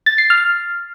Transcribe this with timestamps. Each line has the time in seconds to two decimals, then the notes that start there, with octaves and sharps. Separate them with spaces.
0.06 A6
0.18 C7
0.30 F6